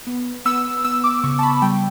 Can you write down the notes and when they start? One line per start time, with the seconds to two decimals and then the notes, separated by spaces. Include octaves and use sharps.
0.07 B3
0.45 B3 E6
0.85 B3 E6
1.04 D6
1.24 C#3 C#6
1.39 A5
1.43 B5
1.62 G3 G5